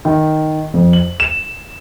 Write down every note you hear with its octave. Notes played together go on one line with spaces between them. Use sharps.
D#3
F2
F#7
E7